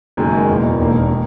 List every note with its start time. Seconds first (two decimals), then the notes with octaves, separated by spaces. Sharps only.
0.17 F#1 F#2 D#3 G#3
0.47 E2 B2 A#3
0.78 E1 D#2 D#3 A#3
1.11 D#3